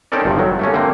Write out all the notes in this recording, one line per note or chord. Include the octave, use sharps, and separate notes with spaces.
C4 C#4 D#4 A4 A#4 D5
G1 G2 C3 D#3 F3
F#3
A3 A#3 C#4
D3 A#3 C4